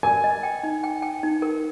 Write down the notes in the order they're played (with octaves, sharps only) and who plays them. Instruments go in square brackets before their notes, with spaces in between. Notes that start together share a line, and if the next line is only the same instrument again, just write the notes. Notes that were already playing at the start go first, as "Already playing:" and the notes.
[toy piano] A#4 [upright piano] G#5
[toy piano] D#5
G5
D#4
G5
G5
D#4
A#4